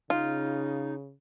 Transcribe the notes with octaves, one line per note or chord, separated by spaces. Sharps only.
C#3 D#4 F4